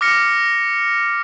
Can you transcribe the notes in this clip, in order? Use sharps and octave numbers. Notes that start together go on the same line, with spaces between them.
D6 F6 A#6 C#7